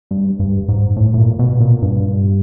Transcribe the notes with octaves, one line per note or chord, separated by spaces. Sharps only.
G2
G2
G#2
A2
A2
A#2
B2
A#2
G2